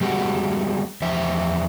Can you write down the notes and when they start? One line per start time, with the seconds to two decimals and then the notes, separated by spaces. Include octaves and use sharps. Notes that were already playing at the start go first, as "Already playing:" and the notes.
0.01 G3 G#3 B3 F#4
1.02 E2 F3 C5 E5